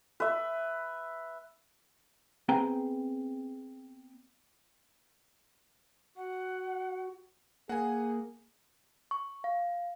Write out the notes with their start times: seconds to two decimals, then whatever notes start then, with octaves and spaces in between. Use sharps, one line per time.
0.20 B4 E5
2.49 B3 C4 G#4 G5 G#5 A#5
6.17 F#4 F#5
7.69 A#3 G#4 F#5 G#5
9.11 C#6
9.44 F5